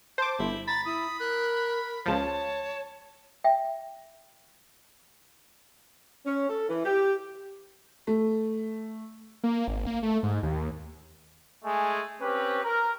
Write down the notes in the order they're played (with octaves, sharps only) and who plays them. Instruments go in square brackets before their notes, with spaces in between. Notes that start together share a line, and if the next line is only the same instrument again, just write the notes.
[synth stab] C5 D6 [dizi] A5
[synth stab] G1 [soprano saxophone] E4
[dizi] A#5 [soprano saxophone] B5 [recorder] A6
[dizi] E4 [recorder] D#6
[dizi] A#4 [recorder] F#6
[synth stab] C#2 F3 [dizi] C#5 [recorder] A5
[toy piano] E5 G5
[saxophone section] C#4
A4
E3
G4
[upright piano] A3
[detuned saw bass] A#3
G#1
A#3
A3
G#2
D#2
[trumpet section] G#3 A3 G#5
C4 C#4 G4 B4
A#4